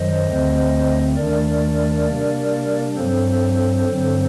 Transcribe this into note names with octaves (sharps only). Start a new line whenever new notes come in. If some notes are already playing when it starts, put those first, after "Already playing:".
Already playing: F#2 D#3 F#3 C5 D#5
D2 D3 A3 C4
D#2 D#3 A3 D4 A#4 D5
C3 G3 A#3 D4
G2 F#3 C4 A4 C5
G2 D3 F#3 C4